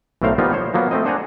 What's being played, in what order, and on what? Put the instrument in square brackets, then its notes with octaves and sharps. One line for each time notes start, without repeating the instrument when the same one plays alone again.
[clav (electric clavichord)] B1 A2 A3 A#4 C5 F5
F3 G3 A#3 B3 D#4 F4
C5 C#5
F3 F#3 A#3 B3
A3 C4 D#5
D4 C5 F#5 G#5 A#5